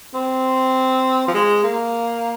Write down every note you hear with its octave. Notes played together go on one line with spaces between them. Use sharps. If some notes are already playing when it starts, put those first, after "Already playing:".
C4
F3
G#3
A#3